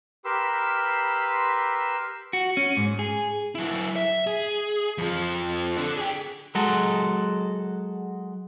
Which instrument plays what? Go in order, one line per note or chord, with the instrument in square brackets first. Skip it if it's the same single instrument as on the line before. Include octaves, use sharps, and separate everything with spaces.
[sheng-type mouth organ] G4 A#4 B4 B5 C6 E6
[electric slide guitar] F#4
C#4
G#2
G#4
[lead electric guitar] F#3 E4
E5
G#4
F2 F3
D4 A4
G#4 G5
[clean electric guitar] F#3 G#3 F#4 A4